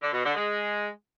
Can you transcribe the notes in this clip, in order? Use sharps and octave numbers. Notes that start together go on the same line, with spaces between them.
D3
B2
D3
G#3